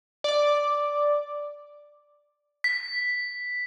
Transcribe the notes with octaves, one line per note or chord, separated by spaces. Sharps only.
D5 D6
B6